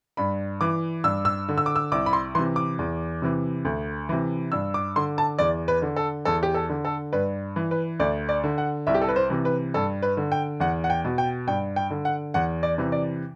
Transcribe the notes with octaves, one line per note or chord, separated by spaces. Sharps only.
G2 B5
E3 D6
G2 E6
E6
D3
E6
D6
E6
C2 D6
B5
C6
C3 E3 C6
D6
E2
C3 E3
D2
C3 E3
G2 E6
D6
D3 C6
A5
E2 D5
B4
D3
A4
E2 A4
G4
A4
D3
A4
G2 B4
E3
B4
D2 D5
D5
D3
F#5
C2 E5
G4
A4
B4
C5
C3 E3
B4
G2 A4
B4
D3
G5
E2 F#5
F#5
G5
B2
G5
G2 G5
G5
D3
F#5
E2 F#5
D5
C3 E3
D5